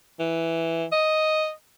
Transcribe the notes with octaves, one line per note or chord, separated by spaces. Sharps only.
E3
D#5